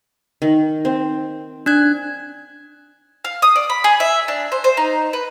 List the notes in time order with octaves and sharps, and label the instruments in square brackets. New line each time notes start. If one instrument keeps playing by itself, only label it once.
[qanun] D#3
C4
[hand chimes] D4 F#6 G#6
[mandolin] F5
D#6
D5
B5
G#4
E5
D4
C5
C5
D#4
B4